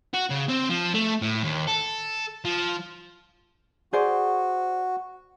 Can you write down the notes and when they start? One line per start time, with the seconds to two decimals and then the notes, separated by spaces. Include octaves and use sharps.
0.14 F#4
0.30 C#3
0.49 C4
0.70 F3
0.94 A3
1.22 A2
1.43 D#2
1.68 A4
2.45 F3
3.93 F#4 G#4 C5 D5